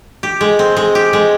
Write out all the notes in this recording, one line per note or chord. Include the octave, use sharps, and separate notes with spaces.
G4
G#3
C4
G#3
G4
G#3